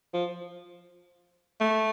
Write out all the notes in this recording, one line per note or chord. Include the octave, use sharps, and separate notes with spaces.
F3
A3